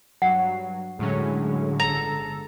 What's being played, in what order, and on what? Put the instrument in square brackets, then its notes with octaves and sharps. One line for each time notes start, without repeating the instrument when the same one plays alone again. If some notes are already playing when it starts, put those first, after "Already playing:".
[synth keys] G2 F#3 [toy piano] F#5
[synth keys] A2 F#3 C#4 [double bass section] D3 G#3
[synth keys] G1 A4 [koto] A#5